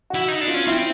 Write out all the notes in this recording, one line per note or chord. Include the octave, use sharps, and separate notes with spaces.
E4 F#4
D#4
D4
F4
C#4
C4 E4